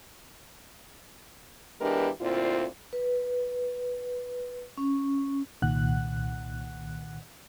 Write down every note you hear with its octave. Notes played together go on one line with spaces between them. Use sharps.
E3 G#3 B3 D4 G4 A#4
D2 A#2 C4 E4 F4
B4
C#4
C2 A#2 D#3 F#5 F#6